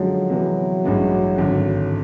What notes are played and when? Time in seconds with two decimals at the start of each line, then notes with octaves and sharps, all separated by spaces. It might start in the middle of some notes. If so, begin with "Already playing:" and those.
Already playing: F#2 D3 F3 F#3 G#3
0.30 C3 E3 G#3 B3
0.84 A1 G2 E3 G#3 C#4
1.38 G#1 F#2 D3